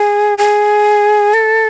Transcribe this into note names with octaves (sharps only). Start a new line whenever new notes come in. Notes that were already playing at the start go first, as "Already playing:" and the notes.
Already playing: G#4
G#4
A4